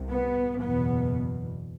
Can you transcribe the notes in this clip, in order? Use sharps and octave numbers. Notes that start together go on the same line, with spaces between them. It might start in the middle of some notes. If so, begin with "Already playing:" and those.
Already playing: C2 C3
B3
F#1 E2 B2 B3